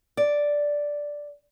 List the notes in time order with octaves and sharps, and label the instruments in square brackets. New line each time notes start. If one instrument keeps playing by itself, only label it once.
[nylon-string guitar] D5